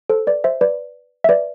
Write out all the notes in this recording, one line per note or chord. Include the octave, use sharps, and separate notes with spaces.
A4 C5
B4 D5
C5 E5
B4 D5
E5
B4 D5